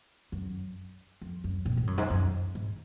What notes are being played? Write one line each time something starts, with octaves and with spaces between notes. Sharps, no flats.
F#2
F2
F#2
A#2
G#2
F#2
G#2
F#2
G#2